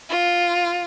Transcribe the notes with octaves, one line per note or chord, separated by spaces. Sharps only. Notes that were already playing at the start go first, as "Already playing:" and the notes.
F4